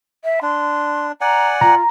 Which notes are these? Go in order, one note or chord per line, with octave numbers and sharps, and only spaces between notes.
E5
D4 C6
D5 F#5 G#5 A#5
F4 A#5